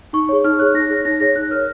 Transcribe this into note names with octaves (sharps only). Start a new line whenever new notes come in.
D#4 C#6
G#4 C#5
D#4 F6
G#4 C#5 F#6
D#4 A#6
G#4 C#5
D#4 A#6
G#4 C#5 A#6
D#4 F#6
A#4 C#5 F6